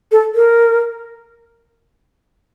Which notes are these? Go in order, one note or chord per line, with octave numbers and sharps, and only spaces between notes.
A4
A#4